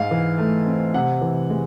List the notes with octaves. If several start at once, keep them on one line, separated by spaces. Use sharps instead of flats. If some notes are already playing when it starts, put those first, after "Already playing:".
Already playing: G#2 F5
E3
A3
C4
C3 F#5
E3
G#3